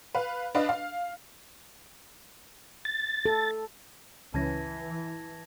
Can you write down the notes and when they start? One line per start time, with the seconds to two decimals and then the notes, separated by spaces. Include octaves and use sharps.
0.15 B4 F5
0.55 D4 B4 D#5 F5
0.69 F5
2.85 A6
3.26 A4
4.34 C#2 E3 C#4 A5 G#6 A#6